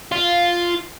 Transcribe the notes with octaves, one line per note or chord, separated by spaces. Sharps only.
F4